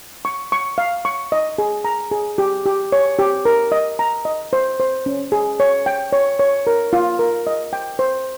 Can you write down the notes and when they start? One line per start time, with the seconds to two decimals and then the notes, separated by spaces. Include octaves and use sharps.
0.25 C#6
0.52 C#6
0.78 F5
1.05 C#6
1.32 D#5
1.58 G#4
1.85 A#5
2.11 G#4
2.38 G4
2.66 G4
2.92 C#5
3.19 G4
3.45 A#4
3.72 D#5
3.99 A#5
4.25 D#5
4.53 C5
4.80 C5
5.06 C#4
5.32 G#4
5.60 C#5
5.86 G5
6.13 C#5
6.39 C#5
6.67 A#4
6.93 F4
7.19 A#4
7.47 D#5
7.73 G5
7.99 C5